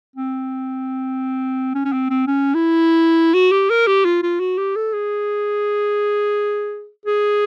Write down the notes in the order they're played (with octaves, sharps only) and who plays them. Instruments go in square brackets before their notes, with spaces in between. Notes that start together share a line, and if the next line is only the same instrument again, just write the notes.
[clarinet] C4
C#4
C#4
C4
C4
C#4
E4
F#4
G4
A#4
G4
F4
F4
F#4
G4
A4
G#4
G#4